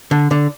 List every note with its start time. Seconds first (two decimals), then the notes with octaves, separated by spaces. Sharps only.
0.11 D3
0.31 D3